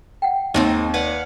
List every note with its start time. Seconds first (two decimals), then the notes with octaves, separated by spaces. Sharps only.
0.22 F#5 G5
0.54 D#2 G#3 C4 D#4 D#5
0.94 B4 D5 F5 F#5